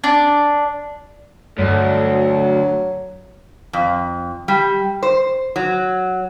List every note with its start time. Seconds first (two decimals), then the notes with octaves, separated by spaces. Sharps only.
0.04 D4
1.58 D2 G2 F#3 A4
3.73 F2
4.48 G3
5.03 C5
5.56 F#3